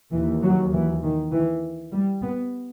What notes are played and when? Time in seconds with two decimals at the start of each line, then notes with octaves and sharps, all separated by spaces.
0.12 D#2 E3
0.42 F#3
0.72 E3
1.03 D#3
1.33 E3
1.92 G3
2.22 B3